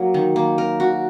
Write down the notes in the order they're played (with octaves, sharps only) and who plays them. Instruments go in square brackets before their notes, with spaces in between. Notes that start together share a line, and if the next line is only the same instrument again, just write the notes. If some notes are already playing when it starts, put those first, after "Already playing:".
Already playing: [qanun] F#3 A#3
D#3
A#3
A#4
F#4